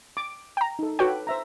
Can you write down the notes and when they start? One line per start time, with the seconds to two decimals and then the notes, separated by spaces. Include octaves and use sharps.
0.17 D6
0.57 G5 A#5
0.79 D#4 A4
0.99 F#4 A4 B4 C#5 G5 D6
1.27 C5 E5 A#5